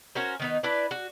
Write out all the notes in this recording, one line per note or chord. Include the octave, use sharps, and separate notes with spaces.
C#4 F#4 A#4 C5
D#3 B3 D#4
D4 E4 B4 D5
F#4